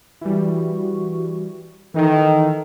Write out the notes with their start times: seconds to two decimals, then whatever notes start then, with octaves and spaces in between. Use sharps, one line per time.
0.21 E3 G3 F#4
1.94 D#3 E3 D#4 A4